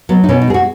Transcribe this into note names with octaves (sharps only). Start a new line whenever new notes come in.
F#3 B3
D#4
B2 C#4
D#4
G#3 G#4
F#4